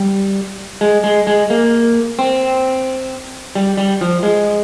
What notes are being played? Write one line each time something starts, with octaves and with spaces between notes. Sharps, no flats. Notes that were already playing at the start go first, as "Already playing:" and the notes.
Already playing: G3
G#3
G#3
G#3
A#3
C4
G3
G3
F3
G#3